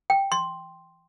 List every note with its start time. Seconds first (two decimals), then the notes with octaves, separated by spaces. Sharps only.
0.10 G5
0.32 C6